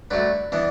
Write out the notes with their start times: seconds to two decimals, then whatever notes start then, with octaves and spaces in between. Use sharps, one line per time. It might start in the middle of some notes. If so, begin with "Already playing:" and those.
0.11 D3 F#3 A3 B4 D5
0.52 E3 B3 D4